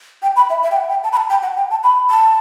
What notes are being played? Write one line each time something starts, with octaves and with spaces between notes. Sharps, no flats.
G5
B5
E5
E5
G5
F#5
G5
A5
B5
A5
G5
F#5
G5
A5
B5
A5